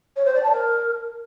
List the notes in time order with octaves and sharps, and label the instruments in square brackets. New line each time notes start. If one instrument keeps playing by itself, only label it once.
[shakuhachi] C#5
C5
D5
A5
A#4